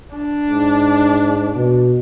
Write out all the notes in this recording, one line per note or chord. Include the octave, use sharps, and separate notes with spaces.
D4
G#2
B2